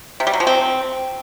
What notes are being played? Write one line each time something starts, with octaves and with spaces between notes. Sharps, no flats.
C3
G3
F#3
F3
C4